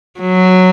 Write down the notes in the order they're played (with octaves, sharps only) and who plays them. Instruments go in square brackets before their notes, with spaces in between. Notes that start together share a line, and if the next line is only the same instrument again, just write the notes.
[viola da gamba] F#3